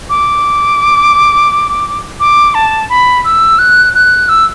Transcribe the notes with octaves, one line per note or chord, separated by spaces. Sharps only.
D6
D6
A5
B5
E6
F#6
F#6
E6